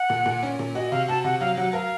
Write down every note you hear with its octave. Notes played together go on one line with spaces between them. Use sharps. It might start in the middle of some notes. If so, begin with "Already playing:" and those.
Already playing: F#5
A#2
A#2
C#4
A#2
F#4 D#5
C3 F5
F#4 A5
C3 F#5
F#3 F5
F#3 F#5
A#4 F5